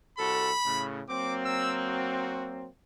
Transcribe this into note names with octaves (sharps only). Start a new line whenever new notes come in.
C2 F#4 A4 B5
A2 C#3
F#3 A#3 C4 D6
E6
F#4